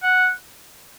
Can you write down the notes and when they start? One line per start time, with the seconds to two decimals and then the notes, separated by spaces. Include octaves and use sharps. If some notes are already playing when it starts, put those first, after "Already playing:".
0.03 F#5